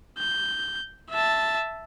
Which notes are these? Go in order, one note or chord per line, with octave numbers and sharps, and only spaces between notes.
G6
E5 A5